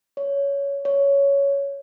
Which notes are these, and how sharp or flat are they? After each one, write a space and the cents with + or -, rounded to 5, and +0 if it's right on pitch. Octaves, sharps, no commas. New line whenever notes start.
C#5 +15
C#5 +10